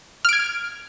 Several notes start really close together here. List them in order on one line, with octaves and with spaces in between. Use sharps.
F6 D7 G#6